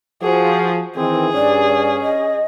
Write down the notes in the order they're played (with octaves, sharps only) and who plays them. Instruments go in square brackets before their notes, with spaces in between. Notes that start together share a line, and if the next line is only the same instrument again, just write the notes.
[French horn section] F3 [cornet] F#4 [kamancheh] G#4
[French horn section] D#3 E3 [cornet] C4 [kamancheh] G#4
[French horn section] G2 [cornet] C#4 [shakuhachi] D5
[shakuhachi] D#5